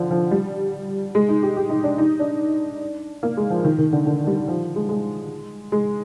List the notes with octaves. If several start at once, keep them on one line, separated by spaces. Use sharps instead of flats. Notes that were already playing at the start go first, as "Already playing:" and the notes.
Already playing: D3 F3
F3
G3
G#3
D#4
G4
G4
D#4
D4
D#4
D4
A#3
G#3
F3
D#3
D#3
D3
D3
G3
F3
G#3
G#3
G#3